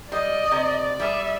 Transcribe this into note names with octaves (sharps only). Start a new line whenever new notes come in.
G3 D5 D#5
C3
G3 G#4 E5